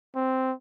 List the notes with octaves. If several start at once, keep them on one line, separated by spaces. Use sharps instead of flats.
C4